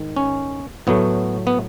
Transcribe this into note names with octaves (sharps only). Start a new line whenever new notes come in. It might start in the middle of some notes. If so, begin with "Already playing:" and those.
Already playing: G#2 D#3
C#4
A2 F#3 A3 B3
B3